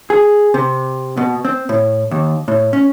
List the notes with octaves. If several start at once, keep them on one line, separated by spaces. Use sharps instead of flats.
G#4
C3
B2
C4
A2
D#2
A2
C#4